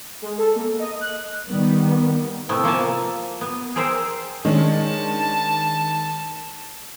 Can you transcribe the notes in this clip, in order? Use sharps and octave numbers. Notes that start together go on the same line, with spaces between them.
G#3
A4
A#3
D#5
F#6
D#3 G3 B3
C3 A3 B3 E4
F3 A#3 G#5 A5
B3
G#4 A#4 C5 E5 G5
D#3 G#3 C#4 D4 A5